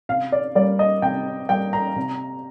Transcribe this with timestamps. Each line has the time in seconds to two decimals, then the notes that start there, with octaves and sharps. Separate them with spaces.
0.09 C3 F5
0.32 D5
0.55 G3 A#3 D5
0.79 D#5
1.02 C3 G5
1.49 G3 A#3 G5
1.73 A#5
1.96 C3